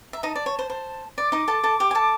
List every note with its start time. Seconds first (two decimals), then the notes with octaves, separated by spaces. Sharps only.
0.13 E5 A#5
0.23 D#4 D#5 A5
0.36 D5
0.46 C#5
0.59 C5
0.70 C5
1.18 D5 D6
1.32 D#4 D#5
1.48 A4 A5
1.64 A4 A5
1.80 G4 G5
1.91 G#5
1.95 A4 A5